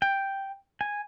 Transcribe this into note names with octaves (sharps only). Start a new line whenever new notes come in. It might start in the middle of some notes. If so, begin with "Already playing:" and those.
G5
G#5